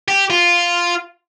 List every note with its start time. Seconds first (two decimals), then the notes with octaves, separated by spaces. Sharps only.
0.08 G4
0.30 F4